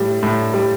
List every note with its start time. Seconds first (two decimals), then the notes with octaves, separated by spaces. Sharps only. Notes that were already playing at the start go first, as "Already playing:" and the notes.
Already playing: A2 G3
0.23 A2
0.54 G3